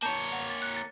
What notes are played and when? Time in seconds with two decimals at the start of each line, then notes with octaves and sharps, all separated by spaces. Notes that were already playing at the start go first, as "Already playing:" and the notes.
0.02 A#3 C#5 A5 G6
0.32 F#5
0.50 A6
0.62 F#6
0.76 A6